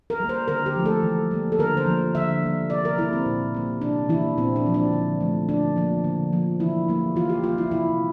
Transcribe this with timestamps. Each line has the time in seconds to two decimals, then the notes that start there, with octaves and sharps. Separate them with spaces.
0.10 A#4
0.20 G3 A#3
0.29 C5
0.48 D3 A#4
0.66 G4
0.76 F3 A3
0.85 A4
1.03 E3
1.31 G3 A#3
1.52 A4
1.59 D3 A#4
1.77 C5
1.86 F3 A#3
2.15 D3 E5
2.43 G3 A#3
2.70 C3 D5
2.85 A#4
2.98 G3 A#3 E4
3.13 C4
3.26 A#2
3.54 G3 A#3
3.81 C3 D4
4.09 E3 A#3 E4
4.38 A#2 C4
4.56 D4
4.66 F3 A#3
4.74 D4
4.93 D3
5.21 F3 A3
5.49 D3 D4
5.76 F3 A#3
6.04 D3
6.33 F3 A#3
6.60 E3 E4
6.89 G3 A#3
7.16 E3 F4
7.29 G4
7.44 G3 A#3 F4
7.58 E4
7.71 C3 E4